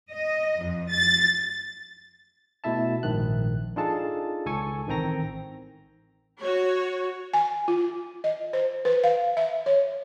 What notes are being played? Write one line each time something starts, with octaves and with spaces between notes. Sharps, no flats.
D#5
F2
A6
B2 A3 E4 E5 A5
A#1 G#2 D#3 F#6
D4 D#4 F4 G#4 A4 A5
C#2 A4 G#5 C#6
A1 D#3 C4 G5 A#5 A#6
F#4 C#5
G#5
F4
D#5
C5
B4
F5
E5
C#5